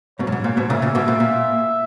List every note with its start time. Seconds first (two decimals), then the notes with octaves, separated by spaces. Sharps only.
0.19 G#2 B2 C#5
0.27 F#2
0.32 G#2
0.44 A#2
0.57 G#2 B2
0.70 A#2 C#3 E5
0.82 A#2 C#3
0.95 G#2 B2
1.08 A#2
1.20 A#2